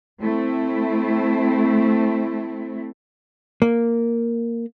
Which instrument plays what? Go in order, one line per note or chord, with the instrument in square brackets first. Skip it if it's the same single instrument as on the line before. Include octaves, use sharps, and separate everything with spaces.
[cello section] A3 C4 E4
[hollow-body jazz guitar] A#3